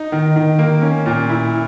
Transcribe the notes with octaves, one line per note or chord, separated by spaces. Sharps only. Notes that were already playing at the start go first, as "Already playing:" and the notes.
Already playing: D#4
D#3
D#3
A#3
C#4
A#2
E4